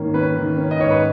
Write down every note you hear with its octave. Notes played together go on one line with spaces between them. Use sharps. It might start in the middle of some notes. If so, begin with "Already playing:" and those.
Already playing: G#2 D#3 A#3 C#4
C#4 B4
D#3
C#4
D#5
G#2 C#5
B4